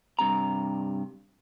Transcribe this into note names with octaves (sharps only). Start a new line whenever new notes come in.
G2 C3 A#5